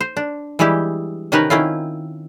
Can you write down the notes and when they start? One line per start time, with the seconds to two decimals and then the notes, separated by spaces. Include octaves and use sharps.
0.01 C5
0.17 D4
0.59 E3 G3 G#3 E4 G4
1.32 C3 D#3 C#4 D#4 A#4 B4
1.50 D#3 C4 C#4 E4 F4